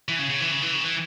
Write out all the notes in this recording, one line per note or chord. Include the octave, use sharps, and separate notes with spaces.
E3
C#3
C#3
E3
C#3
E3
C#3
E3